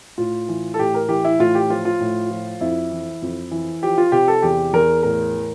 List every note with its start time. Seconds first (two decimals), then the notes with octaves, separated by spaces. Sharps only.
0.18 A2 F4
0.49 E3
0.74 A4
0.79 A2 G4
0.94 A#4
1.09 E3 G4
1.25 E4
1.39 A2 F4
1.55 G4
1.70 F3 F4
1.85 F4
2.00 A2
2.30 F3
2.61 F2 E4
2.92 E3
3.22 F2
3.51 E3
3.82 F3 G4
3.98 F4
4.12 C3 G4
4.28 A4
4.42 E2 G4
4.73 E2 A#4
5.03 A2 A#4
5.33 E3